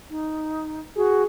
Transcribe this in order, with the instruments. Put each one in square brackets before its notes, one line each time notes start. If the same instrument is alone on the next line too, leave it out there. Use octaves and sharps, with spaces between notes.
[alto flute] D#4
[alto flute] F#4 [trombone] G#4